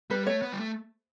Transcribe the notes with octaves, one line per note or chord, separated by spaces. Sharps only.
G3 B4
A3 C#5
B3
G3
A3